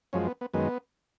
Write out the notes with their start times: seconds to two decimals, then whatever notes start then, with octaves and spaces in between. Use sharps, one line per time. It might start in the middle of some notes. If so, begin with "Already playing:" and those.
0.13 F#2 F3 G#3 C#4
0.27 B3
0.41 B3
0.54 F#2 D#3 G#3 B3